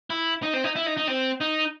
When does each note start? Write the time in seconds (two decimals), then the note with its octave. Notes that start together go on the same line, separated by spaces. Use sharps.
0.10 E4
0.43 D#4
0.54 C4
0.64 D#4
0.76 E4
0.86 D#4
0.97 D#4
1.08 C4
1.41 D#4